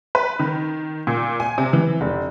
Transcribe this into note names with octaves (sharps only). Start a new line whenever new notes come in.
B4
D#3
A#2
G#5
C3
E3
F1